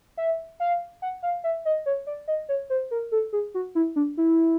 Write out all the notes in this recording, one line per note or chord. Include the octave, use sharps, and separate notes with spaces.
E5
F5
F#5
F5
E5
D#5
C#5
D5
D#5
C#5
C5
A#4
A4
G#4
F#4
E4
D4
E4